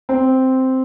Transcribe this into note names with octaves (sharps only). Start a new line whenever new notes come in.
C4